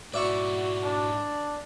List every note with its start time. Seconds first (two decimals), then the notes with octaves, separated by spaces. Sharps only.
0.14 G#2 E4 F#4 D5 E5 C#6
0.83 D4